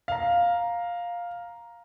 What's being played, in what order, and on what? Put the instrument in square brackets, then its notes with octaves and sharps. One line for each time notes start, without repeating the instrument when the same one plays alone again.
[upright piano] F5 A#5